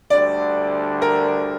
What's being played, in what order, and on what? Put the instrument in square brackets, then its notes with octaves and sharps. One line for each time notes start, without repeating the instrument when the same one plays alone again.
[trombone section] D2 D3 G3 D4 [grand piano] D5
[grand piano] A#4